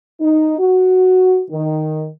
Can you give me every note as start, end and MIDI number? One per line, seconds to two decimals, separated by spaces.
0.21 0.54 63
0.59 1.42 66
1.51 2.08 51